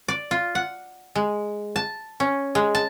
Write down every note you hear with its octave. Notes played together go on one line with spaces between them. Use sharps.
D5
F4
F#5
G#3
A5
C#4
G#3
A5